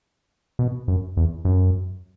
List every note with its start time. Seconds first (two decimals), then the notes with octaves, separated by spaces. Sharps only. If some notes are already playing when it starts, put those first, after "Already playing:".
0.59 B2
0.88 F#2
1.17 E2
1.45 F#2